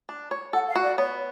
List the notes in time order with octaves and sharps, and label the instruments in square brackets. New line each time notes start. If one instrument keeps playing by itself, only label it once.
[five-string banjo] D4
C#5
[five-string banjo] A4 [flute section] F#5
[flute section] F5
[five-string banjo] F#4
[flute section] D5
[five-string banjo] B3 [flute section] C#5